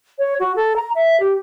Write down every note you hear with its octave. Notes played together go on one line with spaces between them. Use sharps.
C#5
F#4
A4
A#5
E5
G4